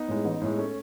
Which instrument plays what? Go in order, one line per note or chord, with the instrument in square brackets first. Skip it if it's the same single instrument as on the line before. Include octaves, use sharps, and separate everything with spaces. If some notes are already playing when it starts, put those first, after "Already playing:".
Already playing: [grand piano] B3 D#4
[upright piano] A2 G#3
A1
A2 G#3
[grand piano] A3 C#4